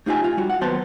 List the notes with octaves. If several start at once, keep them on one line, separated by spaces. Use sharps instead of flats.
A3 D#4 F4 G4 D#5 G#5
F4
G3 F#4
F5 F#5
D#2 F#3 B3 C5 A5